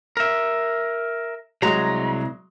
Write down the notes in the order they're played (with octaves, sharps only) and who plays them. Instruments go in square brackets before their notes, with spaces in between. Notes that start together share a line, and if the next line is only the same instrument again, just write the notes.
[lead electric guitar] A#4 E5
[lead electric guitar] C2 A#5 [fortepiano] F#3 G#3